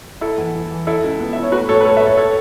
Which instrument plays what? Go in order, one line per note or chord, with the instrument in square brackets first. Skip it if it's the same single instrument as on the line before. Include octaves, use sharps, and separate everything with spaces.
[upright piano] E4 A4
E2
E2
E3
E4 A4
C#2
B3
E4 E5
C#5
A3 F#4 B4
A2 A4 C#5
B4
A3 A4 C#5
B4 E5
A2
A4 C#5
A4 C#5